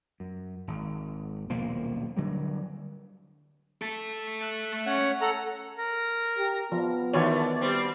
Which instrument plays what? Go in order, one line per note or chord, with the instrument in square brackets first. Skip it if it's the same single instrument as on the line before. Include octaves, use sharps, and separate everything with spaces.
[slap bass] F#2
G#1
D#1 B1 F3 A#3
D3 F#3 G3
[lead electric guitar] A3 A4
[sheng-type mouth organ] F#6
C#4 C#5 F#5
A4 F#5 A#5
[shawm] A#4
[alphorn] G4
[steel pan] F3 [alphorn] B3
[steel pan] D#3 F#4 C#5 [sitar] E3 A3 [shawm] D5
[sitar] G3 C4